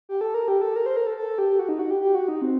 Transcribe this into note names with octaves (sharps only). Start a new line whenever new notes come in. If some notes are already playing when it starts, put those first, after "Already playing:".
G4
A4
A#4
G4
A4
A#4
C5
A#4
A4
A4
G4
F#4
D#4
F#4
G4
G4
F#4
D#4
C4